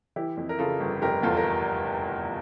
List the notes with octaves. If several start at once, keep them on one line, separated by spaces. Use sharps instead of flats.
E3 E4 G4
F2
A#4
C#3 F4 A4
G1
F1 G4 A#4
E2 F4 A4
A#4